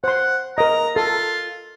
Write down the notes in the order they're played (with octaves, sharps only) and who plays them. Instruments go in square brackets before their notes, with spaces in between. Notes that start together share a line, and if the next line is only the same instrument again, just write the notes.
[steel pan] C5 C6 [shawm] F#5
[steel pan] A#4 D#5 [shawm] A#5
[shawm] F4 [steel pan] A4